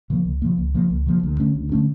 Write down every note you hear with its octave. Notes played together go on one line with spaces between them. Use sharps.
C#3 F3 A#3
C#2
C#3 F3 A#3
C#2
C#3 F3 A#3
C#2
C#3 F3 A#3
D2
D3 A3 C#4
D2
D3 A3 C#4